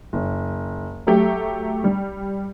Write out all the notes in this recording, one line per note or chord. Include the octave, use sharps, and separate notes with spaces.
F#1
F#3 A3 G4
G3